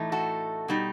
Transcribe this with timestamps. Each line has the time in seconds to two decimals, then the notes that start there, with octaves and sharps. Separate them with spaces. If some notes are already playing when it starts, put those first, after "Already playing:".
Already playing: A2 E3 A3 D#4
0.12 F#4 A4
0.68 B2 G3 D#4